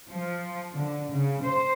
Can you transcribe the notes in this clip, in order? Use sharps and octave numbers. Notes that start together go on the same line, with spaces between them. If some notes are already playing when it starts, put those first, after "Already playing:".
F3
D3
C#3
C5